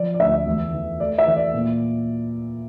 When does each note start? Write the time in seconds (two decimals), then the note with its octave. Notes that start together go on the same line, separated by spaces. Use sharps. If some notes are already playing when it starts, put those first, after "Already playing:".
Already playing: F3 D5
0.14 D5
0.19 D2 E5
0.46 E2
0.73 E3
1.00 A3 D5
1.18 E5
1.27 E3
1.36 D5
1.54 A#2